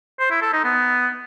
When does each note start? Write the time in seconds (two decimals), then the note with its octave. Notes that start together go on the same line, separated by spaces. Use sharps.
0.20 C5
0.31 E4
0.42 A4
0.53 D#4
0.64 B3